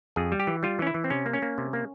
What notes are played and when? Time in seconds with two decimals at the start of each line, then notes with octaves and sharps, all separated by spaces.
0.16 F2 G#4
0.32 G3
0.40 G4
0.47 E3
0.63 G3 F4
0.79 E3 C#4
0.87 E4
0.94 E3
1.04 C4
1.10 C3 C#4
1.26 A#3
1.33 C#4
1.42 A#3
1.58 C3
1.73 A#3